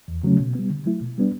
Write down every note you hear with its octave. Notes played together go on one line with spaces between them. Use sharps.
E2
C#3 F#3 A3 C#4
B2
G3 B3
D3
F#3 A3 E4
B2
G3 B3 D4